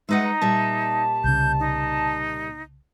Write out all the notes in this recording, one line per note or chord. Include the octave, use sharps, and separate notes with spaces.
G#3 D#4 B4 E5 F#5
A#5
A#2 G3 E5 A5
C2 C#3 G6
D#4